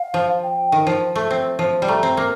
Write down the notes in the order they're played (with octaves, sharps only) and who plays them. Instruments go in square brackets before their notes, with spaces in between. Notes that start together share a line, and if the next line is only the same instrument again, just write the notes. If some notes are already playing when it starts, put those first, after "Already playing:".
Already playing: [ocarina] F5
[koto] F3
[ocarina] G5
[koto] D#3
F3
A3
C4
F3
G3
[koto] A3 [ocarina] A#5
[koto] C4
A#3